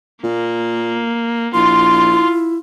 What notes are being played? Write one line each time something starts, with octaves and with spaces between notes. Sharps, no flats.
A#2 A#3
A#1 E4 F4 C6